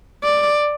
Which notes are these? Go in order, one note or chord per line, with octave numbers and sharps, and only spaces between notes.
D5